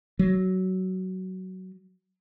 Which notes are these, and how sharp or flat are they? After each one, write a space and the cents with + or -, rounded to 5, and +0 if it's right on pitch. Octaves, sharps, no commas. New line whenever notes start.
F#3 +15